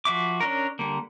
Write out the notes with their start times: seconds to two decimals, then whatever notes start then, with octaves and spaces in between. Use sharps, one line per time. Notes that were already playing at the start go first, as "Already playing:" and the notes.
0.05 F3 F#4 E5 D6
0.40 C#4 D4 A#4
0.79 D3 G3 A#3